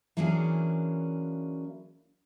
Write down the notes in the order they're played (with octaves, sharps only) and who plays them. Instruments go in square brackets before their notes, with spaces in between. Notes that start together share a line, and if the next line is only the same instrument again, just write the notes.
[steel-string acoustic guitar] E3 F#3 A#3 C#4 D4 G#4